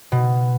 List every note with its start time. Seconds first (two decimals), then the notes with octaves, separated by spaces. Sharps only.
0.12 B2